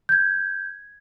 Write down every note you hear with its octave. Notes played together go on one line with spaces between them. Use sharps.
G6 G#6